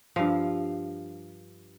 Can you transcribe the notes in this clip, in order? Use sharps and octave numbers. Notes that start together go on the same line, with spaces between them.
G2 F3